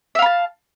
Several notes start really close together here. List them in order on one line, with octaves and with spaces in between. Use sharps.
E5 F5 B5 A5